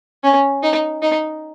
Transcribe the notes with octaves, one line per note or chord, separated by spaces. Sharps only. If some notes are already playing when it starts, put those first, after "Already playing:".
C#4
D#4
D#4